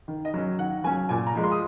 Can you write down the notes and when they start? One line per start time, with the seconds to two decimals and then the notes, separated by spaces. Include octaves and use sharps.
0.08 D#3
0.25 D#5
0.34 F#3 C#4
0.59 D#3 F#5
0.84 F#3 C#4 G#5
1.09 A#2 G#5
1.27 A#5
1.35 F3 G#3
1.43 C6
1.52 D#6